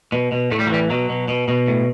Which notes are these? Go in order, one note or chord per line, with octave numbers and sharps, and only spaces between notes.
B2
B2
A2 A3
G3
F#3
E3 G3
B2 F#3
B2
B2
B2
A2